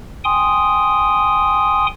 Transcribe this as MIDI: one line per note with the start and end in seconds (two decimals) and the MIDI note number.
0.24 1.87 79
0.24 1.87 80
0.24 1.87 84
0.24 1.87 87